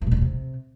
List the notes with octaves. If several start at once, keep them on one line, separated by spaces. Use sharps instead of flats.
E3
A#2
D3
C#3
C3